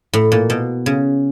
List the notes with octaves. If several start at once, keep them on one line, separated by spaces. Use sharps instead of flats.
A2
A#2
B2
C#3